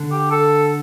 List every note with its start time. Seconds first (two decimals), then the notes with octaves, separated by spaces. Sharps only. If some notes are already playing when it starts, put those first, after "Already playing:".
Already playing: D3
0.12 G4
0.31 A4